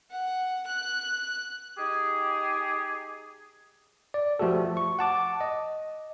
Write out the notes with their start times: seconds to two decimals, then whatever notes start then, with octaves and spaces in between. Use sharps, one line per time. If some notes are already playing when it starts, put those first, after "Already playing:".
0.10 F#5
0.67 F#6
1.78 D#4 G4 G#4
4.14 D5
4.39 F3 A3 F#4 G4 A4
4.77 C#6
4.99 F#5 A5 D6
5.41 D#5